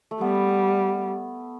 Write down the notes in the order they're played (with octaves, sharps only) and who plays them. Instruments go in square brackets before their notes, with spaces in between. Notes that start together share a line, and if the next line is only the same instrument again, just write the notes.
[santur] A3
[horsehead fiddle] G3 [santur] B3